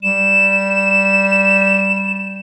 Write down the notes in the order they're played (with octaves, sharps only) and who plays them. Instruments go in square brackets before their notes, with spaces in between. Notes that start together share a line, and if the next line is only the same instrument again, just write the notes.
[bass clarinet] G3 [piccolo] E7